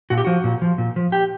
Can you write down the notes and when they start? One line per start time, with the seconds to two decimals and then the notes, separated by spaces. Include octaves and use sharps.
0.10 A#2 F#4
0.18 G4
0.25 F3 F#4
0.44 A#2
0.62 F3
0.78 A#2
0.96 F3
1.12 G4